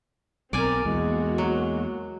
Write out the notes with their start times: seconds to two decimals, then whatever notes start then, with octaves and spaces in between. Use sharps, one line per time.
0.53 B1 C4 A#4 D5 G#5
0.85 E2 G#3 A#3 F#4
1.38 F#3